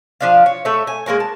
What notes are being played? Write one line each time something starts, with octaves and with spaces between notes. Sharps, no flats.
F3 D4 F5
C#5
A3 C#5 E5
G#5
G#3 A#3 A#4 C#5
A5